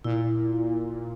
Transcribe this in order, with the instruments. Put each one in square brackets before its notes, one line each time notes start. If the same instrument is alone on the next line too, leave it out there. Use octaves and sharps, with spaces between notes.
[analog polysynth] A#2 [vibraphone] E4